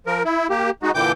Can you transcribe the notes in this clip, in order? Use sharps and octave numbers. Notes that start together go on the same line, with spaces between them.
F3 A#4
E4
A#3 G4
G#3 D#4 F#4
A#2 D3 E3 G5 D6 G6